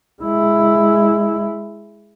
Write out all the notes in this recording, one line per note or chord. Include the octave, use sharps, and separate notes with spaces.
G#3 E4